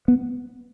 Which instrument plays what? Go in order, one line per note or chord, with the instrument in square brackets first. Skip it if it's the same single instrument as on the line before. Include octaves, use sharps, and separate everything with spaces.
[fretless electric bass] B3